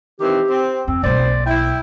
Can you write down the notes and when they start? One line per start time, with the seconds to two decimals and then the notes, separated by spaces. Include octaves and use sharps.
0.20 D#3 E3 C4 G4
0.49 C4
0.88 F2 C4
1.04 B1 A#3 C5 D5
1.46 E4 G5